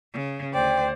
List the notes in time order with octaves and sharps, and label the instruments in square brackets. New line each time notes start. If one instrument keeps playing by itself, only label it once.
[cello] C#3
[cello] D2 D5 [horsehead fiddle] C5 [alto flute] G5